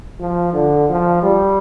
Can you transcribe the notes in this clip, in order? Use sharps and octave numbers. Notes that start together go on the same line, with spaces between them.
F3
D3
F3
G3